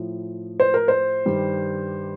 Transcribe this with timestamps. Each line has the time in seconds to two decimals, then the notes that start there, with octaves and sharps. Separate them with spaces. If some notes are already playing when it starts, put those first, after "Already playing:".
Already playing: A2 F3
0.60 C5
0.74 A#4
0.88 C5
1.25 G2 D#3 G3